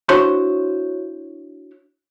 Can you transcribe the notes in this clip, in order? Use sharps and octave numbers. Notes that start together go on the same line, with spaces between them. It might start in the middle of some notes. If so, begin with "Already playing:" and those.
D4 E4 F#4 C5 C#5 C6